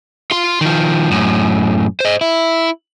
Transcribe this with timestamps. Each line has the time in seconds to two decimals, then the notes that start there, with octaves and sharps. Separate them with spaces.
0.31 F4 C6
0.61 D#3 F3
1.11 F#2 A2
2.00 C5 D#5
2.21 E4